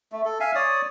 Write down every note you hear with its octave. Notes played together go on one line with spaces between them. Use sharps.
A3
A4
E5 F5 G#5
C#5 D5 D#6